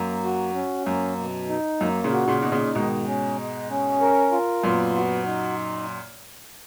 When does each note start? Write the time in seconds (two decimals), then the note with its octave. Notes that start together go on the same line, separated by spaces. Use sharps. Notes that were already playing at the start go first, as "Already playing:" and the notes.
Already playing: F#2 A#3
0.24 F#4
0.55 C#4
0.87 F#2 A#3
1.18 B2
1.49 D#4
1.81 F#2 A#3
2.04 A#2 C#3
2.13 F#4
2.28 A#2 C#3
2.42 B2 D#4
2.52 A#2 C#3
2.75 G#2 B2 D#3
3.07 C#4
3.38 G#3
3.70 C#4
4.01 A#4
4.32 F4
4.63 F#2 A#2 B3
4.96 F#4
5.26 D#4